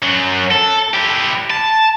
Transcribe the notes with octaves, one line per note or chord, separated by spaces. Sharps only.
F#2 F#3
A4
E4 G4
A5